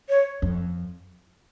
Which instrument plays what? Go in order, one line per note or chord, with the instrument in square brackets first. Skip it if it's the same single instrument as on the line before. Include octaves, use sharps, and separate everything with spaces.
[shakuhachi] C#5
[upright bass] F2